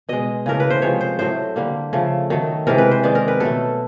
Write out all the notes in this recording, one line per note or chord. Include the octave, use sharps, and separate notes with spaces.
B2 G#3 D#5
C#3 E3 A3 A#4
B4
C5
C3 F3 G#3 C#5
C5
A2 F#3 A3 C5
D3 G3 A#3
C#3 F3 A3
D#3 F#3 A3
C3 E3 G#3 A#4
B4
C5
D#3 G#3 D5
A#4
B4
B2 F#3 A3 A4